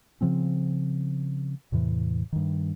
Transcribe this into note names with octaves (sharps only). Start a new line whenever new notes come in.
C#3 F3 C4 C#4
E2 A2 C3 E3
G2 D#3